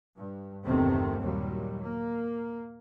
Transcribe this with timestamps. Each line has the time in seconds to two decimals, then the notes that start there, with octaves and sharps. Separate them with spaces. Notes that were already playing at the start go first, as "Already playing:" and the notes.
0.16 G2
0.66 G1 E2 C3 D#3 A3 C4
1.22 D#2 A#2 F#3 G3
1.83 A#3